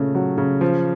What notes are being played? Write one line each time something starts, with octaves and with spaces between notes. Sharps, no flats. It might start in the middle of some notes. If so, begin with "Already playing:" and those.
Already playing: A#2 C#3 A3
F#3
C#3
F3